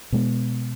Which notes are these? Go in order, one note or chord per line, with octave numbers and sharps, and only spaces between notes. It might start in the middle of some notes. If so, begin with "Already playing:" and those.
B2 G#3 B3